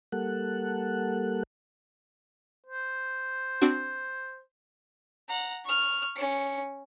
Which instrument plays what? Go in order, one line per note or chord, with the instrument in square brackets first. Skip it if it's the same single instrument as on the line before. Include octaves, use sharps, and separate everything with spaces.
[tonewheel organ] G3 A#3 A4 F#5
[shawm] C5
[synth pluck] C4 D4 F#4
[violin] F#5 A#5
C#6 F6
C#4 C#7